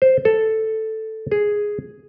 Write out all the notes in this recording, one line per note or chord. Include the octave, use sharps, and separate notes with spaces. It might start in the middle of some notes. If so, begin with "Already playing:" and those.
C5
A4
G#4